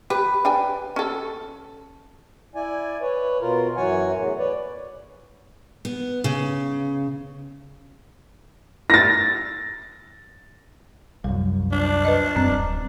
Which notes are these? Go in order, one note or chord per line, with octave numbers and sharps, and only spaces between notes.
G4 B4
D4 G5 G#5
C#4 A4
E4 D5 G#5
B4 C#5
B2 F4 A#4
F#2 E3 F#3 C#5 F#5 G#5
E2 A2
B4 C#5 D5
B3
C#3
A6 A#6
C2 F#2 G3
D4
B4 D#5
F#2 G3 C4
D1